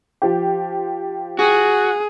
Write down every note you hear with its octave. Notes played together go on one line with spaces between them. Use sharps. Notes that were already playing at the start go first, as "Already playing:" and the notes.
F3 G4
F#4 G#4